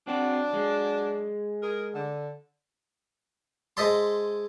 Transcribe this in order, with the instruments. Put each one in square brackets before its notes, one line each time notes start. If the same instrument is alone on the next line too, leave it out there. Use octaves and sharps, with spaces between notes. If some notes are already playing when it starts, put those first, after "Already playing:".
[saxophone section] F#3 D4 [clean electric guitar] C4 F#4
[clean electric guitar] G#3
[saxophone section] G#4 A#4
D3
[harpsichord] G#3 C5 D#5 E5 A5 C6